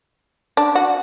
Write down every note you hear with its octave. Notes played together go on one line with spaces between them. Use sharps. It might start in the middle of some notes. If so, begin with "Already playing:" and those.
D4
F#4